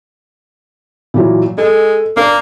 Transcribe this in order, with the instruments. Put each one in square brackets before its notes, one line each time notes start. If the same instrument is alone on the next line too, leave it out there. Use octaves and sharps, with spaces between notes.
[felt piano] A#2 E3 F#3
[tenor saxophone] G#3 [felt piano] A4
[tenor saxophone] A#3 [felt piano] D4